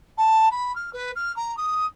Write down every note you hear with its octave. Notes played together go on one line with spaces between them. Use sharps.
A5
B5
F6
B4
F6
A#5
D#6